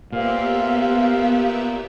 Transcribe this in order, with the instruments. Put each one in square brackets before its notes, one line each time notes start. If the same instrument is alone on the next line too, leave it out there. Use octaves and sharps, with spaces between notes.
[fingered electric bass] A#2 [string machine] B3 G4 E5 [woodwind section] A#4 C5 F5